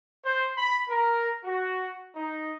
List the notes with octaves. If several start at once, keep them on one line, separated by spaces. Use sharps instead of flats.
C5
B5
A#4
F#4
D#4